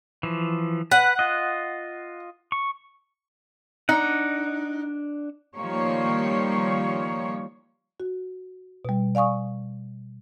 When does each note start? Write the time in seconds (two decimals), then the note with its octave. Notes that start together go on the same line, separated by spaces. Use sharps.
0.23 E3 F3
0.91 B4 F#5
1.19 F4 D#5
2.52 C#6
3.89 D4 D#4 F#5
5.56 D#3 F3 G3 A#3 C#5
8.00 F#4
8.85 B2 G3
9.15 D5 F5 G#5 C#6 D#6